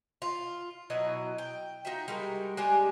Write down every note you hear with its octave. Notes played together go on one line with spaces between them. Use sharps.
F4
B2 F#3 E4 D#5
G5
D#4 F4 F#4 E5
G3 G#3 F#4 A#4
G#3 D4 G4 G#4